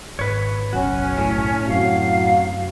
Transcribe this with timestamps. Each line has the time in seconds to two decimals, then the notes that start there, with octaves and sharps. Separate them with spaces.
0.19 G#1 B4 C#5
0.73 F#1 B1 C#4 F#4
1.18 A2
1.68 F#2 C3 F#3 F#4 F5